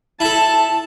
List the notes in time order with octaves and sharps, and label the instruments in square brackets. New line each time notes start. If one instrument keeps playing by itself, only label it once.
[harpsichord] E4 A4 [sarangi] A5